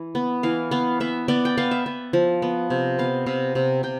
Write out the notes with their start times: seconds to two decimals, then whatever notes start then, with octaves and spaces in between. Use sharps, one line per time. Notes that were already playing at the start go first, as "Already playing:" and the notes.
Already playing: E3
0.15 B3
0.43 E3 F5
0.71 B3 F5
1.00 B3 E5
1.28 B3 D5
1.45 G5
1.57 B3 F5
1.71 E5
1.86 B3
2.13 F3
2.42 B3
2.70 C3
2.98 B3 F5
3.26 C3 F5
3.55 C3
3.83 C3 G5